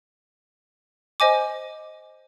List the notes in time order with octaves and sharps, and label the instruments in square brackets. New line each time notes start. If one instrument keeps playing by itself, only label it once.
[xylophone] C5 D#5 G#5 D6